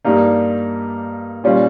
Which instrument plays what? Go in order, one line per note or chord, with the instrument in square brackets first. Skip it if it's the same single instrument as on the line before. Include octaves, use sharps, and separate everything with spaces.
[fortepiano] G2 G3 A#3 D#4
A#2 G3 C#4 F4